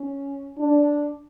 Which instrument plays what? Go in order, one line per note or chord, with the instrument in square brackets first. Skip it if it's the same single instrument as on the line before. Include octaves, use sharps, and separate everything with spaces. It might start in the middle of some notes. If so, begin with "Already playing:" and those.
Already playing: [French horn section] C#4
D4